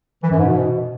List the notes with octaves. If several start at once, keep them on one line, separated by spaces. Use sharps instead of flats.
E3
F#2
G#2
B2